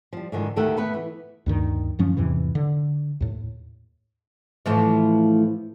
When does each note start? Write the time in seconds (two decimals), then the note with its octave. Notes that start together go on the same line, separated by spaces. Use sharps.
0.13 F3 G3
0.32 G#2 D3 D#3 F3
0.56 D2 D#3 A3 G4 A4 F#5
0.77 A3 B3 B4
0.94 E3
1.46 D2 G2 D#3
1.99 F#2 F3 C#4
2.17 E2 G#2 C3 E3
2.55 D3
3.20 D#2 A2
4.66 A2 E3 F3